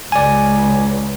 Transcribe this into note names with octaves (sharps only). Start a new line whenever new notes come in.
C#2 D5 G#5